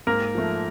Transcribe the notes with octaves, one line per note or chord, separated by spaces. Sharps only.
G#2 A#3 A#4
F3 A3